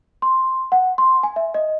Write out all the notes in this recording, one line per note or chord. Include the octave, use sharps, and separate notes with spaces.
C6
F#5
C6
G#5
E5
D#5